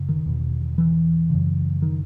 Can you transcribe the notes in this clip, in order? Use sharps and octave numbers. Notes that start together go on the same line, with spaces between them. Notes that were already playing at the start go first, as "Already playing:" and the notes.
Already playing: F#2 C#3
D#3
E2 B2
E3
F#2 C#3
D#3